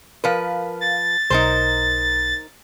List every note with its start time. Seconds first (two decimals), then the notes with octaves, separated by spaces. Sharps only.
0.24 F3 A#4 B4 F5
0.81 A6
1.30 B1 D#4 A#4 C5